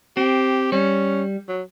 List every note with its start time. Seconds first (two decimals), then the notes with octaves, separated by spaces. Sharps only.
0.17 C4 G4
0.72 G3 C#4
1.49 F#3